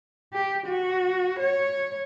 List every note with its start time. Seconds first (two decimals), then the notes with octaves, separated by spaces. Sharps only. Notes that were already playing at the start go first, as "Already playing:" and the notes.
0.33 G4
0.67 F#4
1.39 C#5